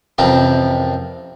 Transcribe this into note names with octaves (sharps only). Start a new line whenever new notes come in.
A1 F2 C3 F3 C4 A#4